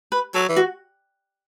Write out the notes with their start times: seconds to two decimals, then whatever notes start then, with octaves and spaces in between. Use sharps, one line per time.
0.12 B4
0.34 F#3 A4
0.49 E3
0.56 F#4